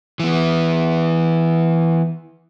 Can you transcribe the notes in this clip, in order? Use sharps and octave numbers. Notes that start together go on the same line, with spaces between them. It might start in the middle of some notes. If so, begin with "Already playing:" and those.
E3 B3